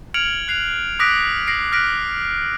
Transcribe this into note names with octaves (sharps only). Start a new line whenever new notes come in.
F6 G#6 C#7 D7 F7 F#7
F#6 C7 F7 F#7
D6 D#6 F#6 A#6 B6 D7
A#6 C7 D7
F6 F#6 A#6 B6 D7